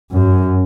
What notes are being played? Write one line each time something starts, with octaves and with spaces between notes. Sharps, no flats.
F#2